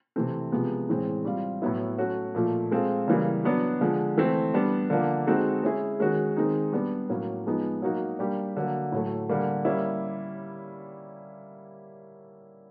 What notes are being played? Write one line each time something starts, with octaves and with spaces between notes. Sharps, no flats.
C3 E3 A3 C4
C3 F3 G#3 B3
A2 E3 G#3 C4
G3 C4 F4
A2 F#3 B3 E4
F#3 A3 C#4 F#4
A#2 F3 A3
G#3 C4 F4 A4
C#3 E3 G3 A#3
F#3 B3 D4 F#4
D3 F3 G#3
E3 A3 C4
G3 B3 D4
D3 F3 A#3 D4
G#3 C4 D#4 F#4 A4
G#3 C#4 E4 G#4
D#3 G#3 C#4 F#4
D#3 G#3 C4 D#4
G3 B3 D4
A2 F#3 A#3 C#4
F3 G#3 B3 D#4 G#4
F#3 A#3 D#4 F#4
G3 A#3 D4 G4
D3 F#3 A#3
A2 F#3 A3
D3 G3 A#3
G3 A#3 C#4 E4